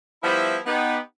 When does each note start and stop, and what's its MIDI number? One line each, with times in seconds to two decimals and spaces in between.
0.22 0.57 53
0.22 0.57 55
0.22 0.57 59
0.22 0.57 64
0.66 0.97 59
0.66 0.97 63
0.66 0.97 67